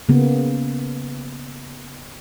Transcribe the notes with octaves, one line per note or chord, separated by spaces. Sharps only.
C#3 A#3 B3